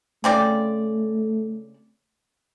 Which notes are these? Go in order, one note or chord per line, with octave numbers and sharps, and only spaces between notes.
C#3 A3 C4 D5